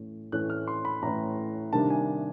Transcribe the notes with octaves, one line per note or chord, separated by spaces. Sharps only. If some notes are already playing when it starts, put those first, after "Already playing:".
Already playing: A2 E3 A3 C#4
A2 E3 A3 C#4 F#6
F6
C6
B5
A2 E3 A3 C#4 A#5
C3 D#3 G3 A#3 D4 A5
G#5